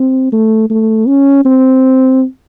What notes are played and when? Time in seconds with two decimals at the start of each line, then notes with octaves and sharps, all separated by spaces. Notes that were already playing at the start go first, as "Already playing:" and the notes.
Already playing: C4
0.32 A3
0.70 A3
1.08 C#4
1.45 C4